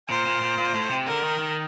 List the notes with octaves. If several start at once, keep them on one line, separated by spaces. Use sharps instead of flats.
A#2 C5
A#2
A#2
A#2
A2
C3
D3 A#4
D#3
D#3